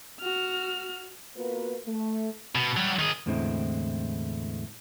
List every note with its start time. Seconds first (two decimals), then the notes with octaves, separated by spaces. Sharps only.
0.20 F#4 F6
1.36 A#3 B3 F4 F#4 A#4 B4
1.87 A3
2.55 B2
2.77 F#3 G3
2.99 D#3 G#4
3.26 E2 A2 D3 G#3 C4 E4